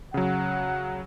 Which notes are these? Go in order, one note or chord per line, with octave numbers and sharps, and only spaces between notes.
C#3 F#3 F#5